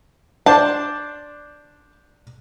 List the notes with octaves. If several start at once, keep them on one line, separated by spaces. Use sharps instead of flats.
D4 C5 A5